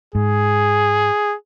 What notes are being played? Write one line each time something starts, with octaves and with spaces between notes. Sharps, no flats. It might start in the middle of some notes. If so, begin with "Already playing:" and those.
G#2 G#4